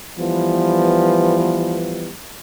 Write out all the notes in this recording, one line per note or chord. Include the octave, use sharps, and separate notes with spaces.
E3 F3 G3 B3